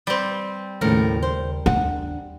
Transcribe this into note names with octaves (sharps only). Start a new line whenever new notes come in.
G3 C4
D#2 A2 C#3 F3 A#4
C5
D4 F#5